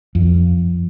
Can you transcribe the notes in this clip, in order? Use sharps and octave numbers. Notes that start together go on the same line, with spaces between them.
F2